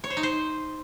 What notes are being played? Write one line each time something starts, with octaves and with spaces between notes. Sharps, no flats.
C#5
C5
D#4
C5